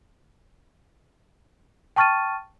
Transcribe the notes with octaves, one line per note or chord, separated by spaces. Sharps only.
G5 A5 C#6 F6 A6 D#7